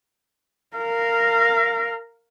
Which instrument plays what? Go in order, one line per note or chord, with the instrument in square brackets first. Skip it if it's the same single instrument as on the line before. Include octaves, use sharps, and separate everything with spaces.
[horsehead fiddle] A#4 F5